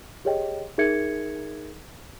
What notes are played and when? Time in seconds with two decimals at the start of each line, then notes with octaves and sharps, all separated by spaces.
0.25 G4 G#4 C#5 D#5 G5
0.78 D#4 G#4 A#4 E5 G#6 C#7